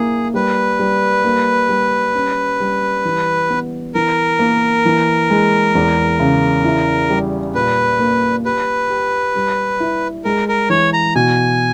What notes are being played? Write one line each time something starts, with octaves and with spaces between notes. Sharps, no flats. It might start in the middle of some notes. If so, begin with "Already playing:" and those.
Already playing: A#3 E4 G#4
G3 B4
G3
A#3
G3
C#4
G3
E3
B3
E3 A#4
A#3
E3
G#3
E2
C#3
E4
G3
A#2 B4
A#3
G4 B4
G4
G3
E4
G#3 A#4
A#4
E3 C#5
A#5
B2 G#5